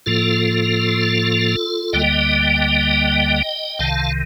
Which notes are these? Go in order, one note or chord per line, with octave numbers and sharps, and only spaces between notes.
A2 F3 A#3 F4 A4
D2 D3 G3 A#3 D#5 G5
C2 C3 D#3 F5 A5